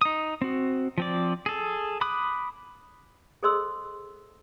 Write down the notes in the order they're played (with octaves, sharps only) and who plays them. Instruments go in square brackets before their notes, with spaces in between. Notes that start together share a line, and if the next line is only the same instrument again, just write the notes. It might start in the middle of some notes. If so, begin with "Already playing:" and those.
[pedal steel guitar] D#4 D#6
C4 F#4
F3 C4 D5
G#4 A4
B5 D6 D#6 F#6
[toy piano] G#4 A4 C5 D#5 C6 E6